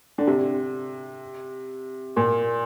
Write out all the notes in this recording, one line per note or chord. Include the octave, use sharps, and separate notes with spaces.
D3
C3
A#2